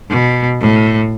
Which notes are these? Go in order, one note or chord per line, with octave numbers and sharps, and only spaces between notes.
B2
A2